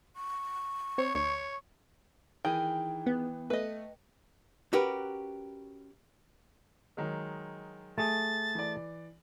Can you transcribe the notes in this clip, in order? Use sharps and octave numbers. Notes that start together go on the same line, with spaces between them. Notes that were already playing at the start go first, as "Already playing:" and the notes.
C#6
C4 C#5
D2 C#5
D#3 E3 G#4 G5
B3
A3 B4 D#5
C#4 F#4 G4 A#4 B4
D#3 F#3 G#3
A3 G#4 A6
E3 D5